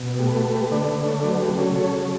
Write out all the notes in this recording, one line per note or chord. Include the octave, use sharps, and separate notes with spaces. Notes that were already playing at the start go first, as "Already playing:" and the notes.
Already playing: B2
A3 G4
B4
F#4 A4
A3
G4 B4
D3 B4 D5
B4 D5
A3
A4 C#5
F#3 B4 D5
G4 B4
C#3
A4 C#5
C#3 A4 C#5
F#3